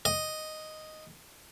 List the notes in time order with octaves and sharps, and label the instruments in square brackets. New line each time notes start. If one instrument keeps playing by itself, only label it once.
[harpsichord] D#5